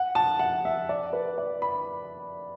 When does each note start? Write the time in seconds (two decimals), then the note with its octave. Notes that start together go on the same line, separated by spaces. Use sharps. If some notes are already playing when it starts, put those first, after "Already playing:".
Already playing: F#5
0.15 A5
0.39 F#5
0.65 E5
0.89 D5
1.13 B4
1.38 D5
1.62 B5